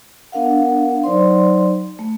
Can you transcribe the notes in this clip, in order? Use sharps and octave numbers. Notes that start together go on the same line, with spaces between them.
B3 D4 A#4 F5 F#5
F#3 D#4 C5 D5 C6
A3